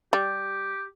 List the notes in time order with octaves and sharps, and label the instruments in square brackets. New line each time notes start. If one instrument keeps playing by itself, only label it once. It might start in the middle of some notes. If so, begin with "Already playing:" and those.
[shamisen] G3 [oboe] G4